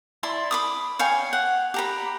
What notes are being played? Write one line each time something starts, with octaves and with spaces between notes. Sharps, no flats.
E4 D5 C6
B5 D6 D#6
C#5 F5 G5 G#5
F#5
G4 A#5 B5